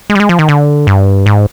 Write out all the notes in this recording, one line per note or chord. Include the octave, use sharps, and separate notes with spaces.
G#3
G3
G#3
F3
D#3
D3
G2
G#2